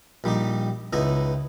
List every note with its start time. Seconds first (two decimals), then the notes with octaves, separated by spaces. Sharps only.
0.24 A#1 G3 D#4 G4
0.93 C#2 B3 D#4 E4 A#5